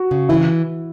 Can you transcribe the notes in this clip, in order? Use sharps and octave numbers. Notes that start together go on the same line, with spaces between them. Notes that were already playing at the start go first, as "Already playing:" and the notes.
Already playing: F#4
C#3
E3 E4